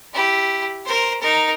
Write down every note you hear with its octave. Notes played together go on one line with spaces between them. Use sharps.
E4 G4
A#4 C5
D#4 A#4